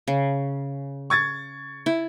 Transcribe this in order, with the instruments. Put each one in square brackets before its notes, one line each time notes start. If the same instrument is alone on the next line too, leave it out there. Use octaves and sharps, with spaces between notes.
[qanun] C#3
[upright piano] C#6 G#6 A6
[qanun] E4